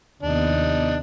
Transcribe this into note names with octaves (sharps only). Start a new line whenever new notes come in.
D#2 C3 B3 D4 D#4